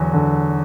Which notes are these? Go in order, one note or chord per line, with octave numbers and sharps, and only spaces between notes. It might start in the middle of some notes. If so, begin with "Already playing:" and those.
Already playing: E2 D3 F#3
D3